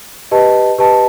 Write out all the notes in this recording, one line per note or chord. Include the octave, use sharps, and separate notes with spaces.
G4 B4 D#5 A5
G4 B4 D#5 A5